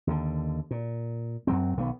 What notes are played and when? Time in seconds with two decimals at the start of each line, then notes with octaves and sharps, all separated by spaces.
0.07 D#2 D3
0.71 A#2
1.47 F#2 F#3 C4
1.77 B1 D#3 F3 B3